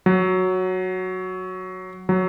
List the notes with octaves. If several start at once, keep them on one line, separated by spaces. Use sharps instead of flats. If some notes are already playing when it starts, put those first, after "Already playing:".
F#3
F#3